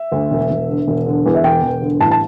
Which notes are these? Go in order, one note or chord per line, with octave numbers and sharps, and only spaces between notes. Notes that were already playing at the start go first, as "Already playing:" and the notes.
Already playing: E5
D2
E1
E1
D3
E1
D3
E2
E5
E1 G5
E1
D3
A1 A5
A5